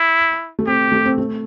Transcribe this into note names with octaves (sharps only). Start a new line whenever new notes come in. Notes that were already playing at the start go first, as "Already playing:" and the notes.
Already playing: E4
A3
C4 G4
A3
C4
A3